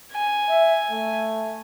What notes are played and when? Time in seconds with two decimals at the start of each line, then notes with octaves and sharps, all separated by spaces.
0.12 G#5
0.49 E5
0.91 A3